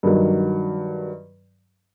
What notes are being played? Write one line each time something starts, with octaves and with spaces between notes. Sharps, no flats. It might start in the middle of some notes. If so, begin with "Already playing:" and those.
G2 D#3 F#3